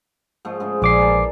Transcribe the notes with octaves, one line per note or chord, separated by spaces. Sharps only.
G#2 F3 A3
G#2 C#3 G#3
A#1 E3 D5 G#5 D6 C7
A#4 A5